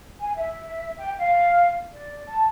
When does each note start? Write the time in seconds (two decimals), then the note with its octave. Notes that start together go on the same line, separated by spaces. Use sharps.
0.21 G#5
0.38 E5
0.97 G5
1.18 F5
1.93 D5
2.27 A5